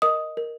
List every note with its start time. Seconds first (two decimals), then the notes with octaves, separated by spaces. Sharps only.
0.02 A#4 D#5 D#6
0.37 A#4